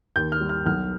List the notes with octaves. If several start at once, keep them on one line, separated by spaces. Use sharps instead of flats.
D#2 G6
F6
G3
F6
B1 F6